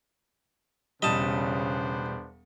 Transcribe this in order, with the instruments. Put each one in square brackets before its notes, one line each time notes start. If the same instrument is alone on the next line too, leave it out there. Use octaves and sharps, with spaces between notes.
[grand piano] E1 G3 [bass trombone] C#3 [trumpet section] B3 D4 C5 [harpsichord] D#5 A5